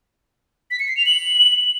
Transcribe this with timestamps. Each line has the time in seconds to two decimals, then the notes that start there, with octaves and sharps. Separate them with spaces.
0.71 B6
0.79 C#7
0.88 C7
0.97 F7
1.06 F#7